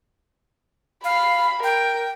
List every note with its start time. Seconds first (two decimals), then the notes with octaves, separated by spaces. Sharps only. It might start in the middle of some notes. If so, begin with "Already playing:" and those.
1.04 F5 B5
1.63 A#4 G5